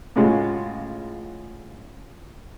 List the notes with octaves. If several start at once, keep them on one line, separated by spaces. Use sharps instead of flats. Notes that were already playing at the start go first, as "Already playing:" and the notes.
A2 C#3 G#3 C#4 F4 F#4